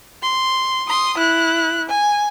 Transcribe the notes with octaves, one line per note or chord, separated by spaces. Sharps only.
C6
C6 D#6
E4 F#6
G#5